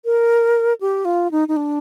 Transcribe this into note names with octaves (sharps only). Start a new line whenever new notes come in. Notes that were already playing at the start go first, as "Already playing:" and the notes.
A#4
G4
F4
D#4
D#4
D4